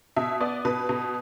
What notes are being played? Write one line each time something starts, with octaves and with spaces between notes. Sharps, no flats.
B2 E5
B3 D5
B2 B4
B2